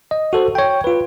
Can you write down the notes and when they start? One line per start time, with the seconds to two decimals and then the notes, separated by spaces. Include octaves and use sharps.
0.11 D#5
0.33 F#4 A4 C5
0.55 C#5 G5
0.84 F4 B4